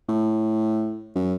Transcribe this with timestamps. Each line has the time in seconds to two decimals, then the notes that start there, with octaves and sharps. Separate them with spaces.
0.09 A2
1.16 F#2